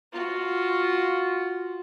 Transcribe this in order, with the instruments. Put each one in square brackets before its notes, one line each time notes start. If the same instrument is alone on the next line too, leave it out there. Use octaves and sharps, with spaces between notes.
[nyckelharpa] F4 F#4